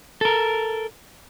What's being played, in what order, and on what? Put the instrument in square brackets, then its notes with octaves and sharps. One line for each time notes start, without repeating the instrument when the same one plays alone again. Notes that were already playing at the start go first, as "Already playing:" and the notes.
[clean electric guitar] A4 A#4